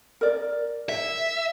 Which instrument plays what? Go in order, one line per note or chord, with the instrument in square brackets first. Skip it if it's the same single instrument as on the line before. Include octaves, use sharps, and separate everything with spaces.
[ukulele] A#4 D5
[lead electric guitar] E5